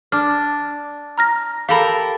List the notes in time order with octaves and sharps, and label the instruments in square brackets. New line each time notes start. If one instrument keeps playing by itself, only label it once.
[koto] D4 [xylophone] D6 F6
[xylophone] A#5 F6 A#6
[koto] G4 A4 A#4 [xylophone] F5 B5